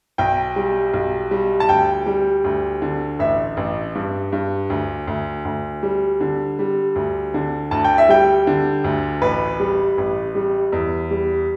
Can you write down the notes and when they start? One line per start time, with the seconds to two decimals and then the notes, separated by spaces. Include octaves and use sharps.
0.18 B1 G5
0.56 G3
0.93 B1
1.31 G3
1.60 A5
1.69 D2 G5
2.06 G3
2.44 D2
2.82 D3
3.19 A1 E5
3.57 A1
3.95 G2
4.32 G2
4.70 D2
5.07 D2
5.45 D2
5.83 G3
6.21 D3
6.59 G3
6.96 D2
7.34 D3
7.71 D2 A5
7.84 G5
7.98 E5
8.09 G3 G5
8.47 D3
8.84 D2
9.22 A1 B4
9.60 G3
9.98 A1
10.35 G3
10.72 E2
11.11 G3